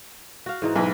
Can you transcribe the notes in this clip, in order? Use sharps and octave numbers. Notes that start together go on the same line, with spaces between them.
F#4 F5
G#2 E3 D#4
B1 E4 B4